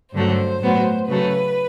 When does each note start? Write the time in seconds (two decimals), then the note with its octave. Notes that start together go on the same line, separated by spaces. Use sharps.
0.13 G2 D3 F#3 A3 C5
0.60 A2 F#3 B3
1.07 C#3 F#3 A3 B4